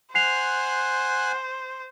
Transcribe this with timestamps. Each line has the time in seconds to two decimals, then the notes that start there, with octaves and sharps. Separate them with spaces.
0.15 C5 F#5 G#5 F#6 C7 F7